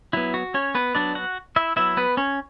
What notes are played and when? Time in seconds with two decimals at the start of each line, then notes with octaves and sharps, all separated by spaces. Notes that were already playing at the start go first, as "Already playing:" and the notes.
0.13 F#3 B3 E4
0.34 F#4
0.54 C#4 C#5
0.75 B3 B4
0.95 F#3 B3 D4 D5
1.15 F#4 F#5
1.56 E4 E5
1.76 F#3 B3 E4 E5
1.97 B3 B4
2.17 C#4 C#5